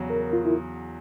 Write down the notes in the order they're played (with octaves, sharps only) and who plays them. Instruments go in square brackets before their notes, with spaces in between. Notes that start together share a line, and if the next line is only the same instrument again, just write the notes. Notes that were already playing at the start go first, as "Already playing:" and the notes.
Already playing: [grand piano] E2 C#3 F#3
[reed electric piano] A#4
F4
E4